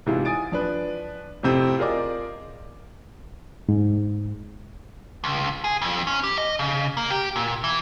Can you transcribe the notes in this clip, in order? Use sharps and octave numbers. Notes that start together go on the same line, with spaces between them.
G#2 C3 E3 E4 F4 G#4
G#5 D#6 A6 D7
F3 D4 B4
F2 A2 C3 C4
F4 G#4 A#4 D5 D#5 D6
G#2
C#2
G#4
F2
C#4
G4
D#5
C#3
A#3
G4
A#2
E3